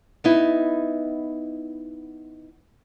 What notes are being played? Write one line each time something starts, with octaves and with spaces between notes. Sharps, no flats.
B3 D#4 E4